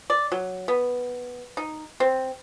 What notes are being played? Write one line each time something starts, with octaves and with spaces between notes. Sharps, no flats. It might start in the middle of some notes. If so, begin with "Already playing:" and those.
D5
F#3
B3
D#4
C4